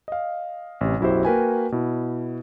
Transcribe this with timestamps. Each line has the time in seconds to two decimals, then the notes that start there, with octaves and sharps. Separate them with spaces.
0.08 D#5 F5
0.81 A1 C3
1.00 B1 F#2 E4 F#4 G4 C5
1.25 A#3 F#4 A#4 B4 G5 G#5
1.72 B2 E4